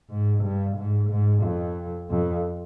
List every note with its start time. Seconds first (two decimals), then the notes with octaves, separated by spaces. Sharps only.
0.10 G#2
0.43 G2
0.76 G#2
1.10 G#2
1.43 F2
2.10 F2